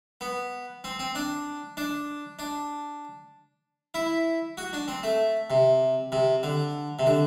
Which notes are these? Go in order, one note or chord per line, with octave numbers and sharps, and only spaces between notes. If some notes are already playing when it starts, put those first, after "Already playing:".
B3
C4
C4
D4
D4
D4
E4
F#4
D4
C4
A3
C3
C3
D3
C3
D3